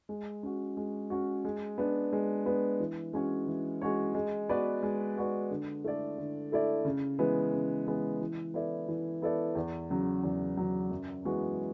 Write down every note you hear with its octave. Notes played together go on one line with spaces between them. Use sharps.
G#3
C#4 F#4
G#3
C#4 F#4
G#3
B3 D4
G#3
B3 D4
E3
G#3 C#4 F#4 C#5
E3
G#3 C#4 F#4 C#5
G#3
B3 F#4 B4 D5
G#3
B3 F#4 B4 D5
D3
A3 E4 A4 D5
D3
A3 E4 A4 D5
C#3
E3 G#3 B3
C#3
E3 G#3 B3
E3
B3 E4 A4 D5
E3
B3 E4 A4 D5
E2
C#3 F#3
E2
C#3 F#3
F#2
E3 G#3 B3 F#4